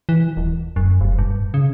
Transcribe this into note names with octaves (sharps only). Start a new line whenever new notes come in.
E3
D#1
F#2
F1
G2
C#3